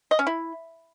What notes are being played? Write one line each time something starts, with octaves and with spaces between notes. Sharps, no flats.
D#5
C#4
E4